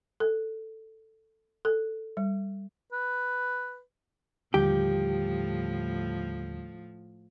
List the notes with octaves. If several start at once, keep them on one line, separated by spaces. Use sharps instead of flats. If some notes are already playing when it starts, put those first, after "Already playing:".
A4
A4
G3
B4
D#2 A2 D3 F3 G3 G4